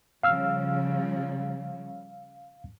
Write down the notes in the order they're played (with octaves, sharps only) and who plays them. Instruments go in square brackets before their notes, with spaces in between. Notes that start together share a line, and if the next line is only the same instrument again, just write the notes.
[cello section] C#3 F3 G3 [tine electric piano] F5 E6 F6